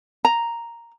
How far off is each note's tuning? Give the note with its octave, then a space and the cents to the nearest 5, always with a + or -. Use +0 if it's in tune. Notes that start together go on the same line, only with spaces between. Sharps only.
A#5 +0